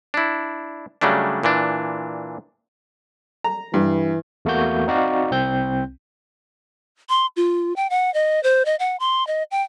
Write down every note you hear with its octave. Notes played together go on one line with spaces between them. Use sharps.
D4 E4
C#3 F#3 G3 A3 D4
A#2 E3 D4
A#5
G2 E3
E2 A3 A#3 F#4 G6
C4 D#4 F#4 D5 F5
C2 C4 G6
C6
F4
G5
F#5
D#5
C5
D#5
F#5
C6
D#5
G5